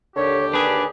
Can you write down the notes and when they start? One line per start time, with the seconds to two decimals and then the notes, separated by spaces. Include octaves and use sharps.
0.17 D#2 D3 G4 C#5
0.53 D4 G#4 B4